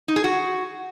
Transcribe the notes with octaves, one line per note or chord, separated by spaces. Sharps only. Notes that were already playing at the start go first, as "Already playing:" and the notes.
D#4
G#4
F#4